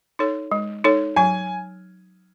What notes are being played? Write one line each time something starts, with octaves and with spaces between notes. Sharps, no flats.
D#4 A4 C#5
G#3
D#4 A4 C#5
F#3 G#5